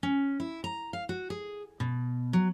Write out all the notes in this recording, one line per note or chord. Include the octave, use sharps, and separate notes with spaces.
C#4
E4
A#5
F5
F#4
G#4
B2
F#3